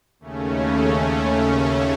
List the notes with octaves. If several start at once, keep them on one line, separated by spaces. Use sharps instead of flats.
D#2 C#3 A3 C#4